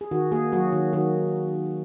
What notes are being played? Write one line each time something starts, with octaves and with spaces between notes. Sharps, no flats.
G#4
D#3 F#4
A#3 G#4
F#3 F#4
D#3
D#3 F#4